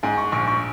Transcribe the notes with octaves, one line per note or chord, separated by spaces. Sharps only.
G#2 G#5
C#6
A#1 C#6
C#6